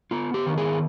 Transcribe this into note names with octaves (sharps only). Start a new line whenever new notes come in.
B3 F4
G4
D#3
G#4